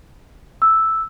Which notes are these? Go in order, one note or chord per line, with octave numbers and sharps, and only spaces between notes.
E6